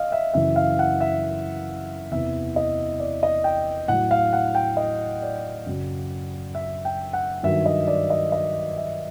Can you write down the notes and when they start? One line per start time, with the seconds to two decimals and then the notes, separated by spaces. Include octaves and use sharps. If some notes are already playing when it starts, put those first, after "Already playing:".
Already playing: D#5 F5
0.12 E5
0.34 F#2 C#3 E3 E5
0.56 F5
0.79 F#5
1.01 E5
2.11 E2 C3 E3 E5
2.56 D#5
3.00 D5
3.23 D#5
3.44 G5
3.88 A2 F#3 F#5
4.11 F5
4.33 F#5
4.55 G5
4.77 D#5
5.22 D5
5.66 F#2 C#3 F#3
6.55 E5
6.85 G5
7.13 F#5
7.43 G2 D#3 F#3 E5
7.66 D#5
7.88 D5
8.10 D#5
8.32 D#5
8.77 E5